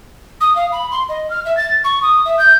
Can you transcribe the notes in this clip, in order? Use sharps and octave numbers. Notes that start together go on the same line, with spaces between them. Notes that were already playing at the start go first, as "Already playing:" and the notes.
D#6
F5
B5
C6
D#5
F6
E5
A6
C#6
D#6
E5
G6